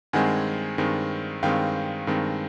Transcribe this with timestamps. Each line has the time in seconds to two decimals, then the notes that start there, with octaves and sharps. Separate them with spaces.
0.13 G2 D#3 G#3 C4 F#5 G#5
0.78 G2 D#3 G#3 C4
1.43 G2 D#3 G#3 C4 F5 G5
2.07 G2 D#3 G#3 C4